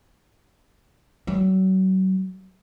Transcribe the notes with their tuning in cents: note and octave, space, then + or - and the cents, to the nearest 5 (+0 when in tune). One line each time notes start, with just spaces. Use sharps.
F#3 +35